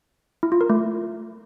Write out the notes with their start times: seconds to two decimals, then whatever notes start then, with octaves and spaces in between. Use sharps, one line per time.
0.43 E4
0.52 F4
0.61 A#4
0.70 A3